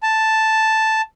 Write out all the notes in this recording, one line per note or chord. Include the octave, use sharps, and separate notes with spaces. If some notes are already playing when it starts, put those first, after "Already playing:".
A5